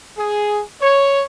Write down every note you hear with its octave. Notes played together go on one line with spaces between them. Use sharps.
G#4
C#5